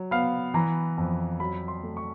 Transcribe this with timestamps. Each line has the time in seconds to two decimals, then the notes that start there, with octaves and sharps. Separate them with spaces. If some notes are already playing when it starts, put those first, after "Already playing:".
Already playing: F#3
0.11 B3 F5
0.54 E3 A#5
0.98 F2
1.40 F#3 B5
1.68 C6
1.83 A3
1.97 C#6